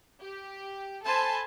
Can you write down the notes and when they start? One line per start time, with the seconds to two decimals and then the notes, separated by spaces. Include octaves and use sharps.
0.20 G4
1.03 A4 C5 G#5 A5 B5 C6